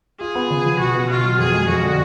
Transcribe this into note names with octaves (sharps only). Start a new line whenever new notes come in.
F4 G#4
B3
C#3
F3
B2 F#4
B3
B2 F4
F#3
F2 G#4
G#3
F2 F#4
D3